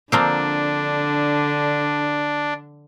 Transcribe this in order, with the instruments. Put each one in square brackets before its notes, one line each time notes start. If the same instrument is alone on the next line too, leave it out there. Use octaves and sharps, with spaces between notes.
[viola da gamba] D3 [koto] F3 A#3 C4 [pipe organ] D4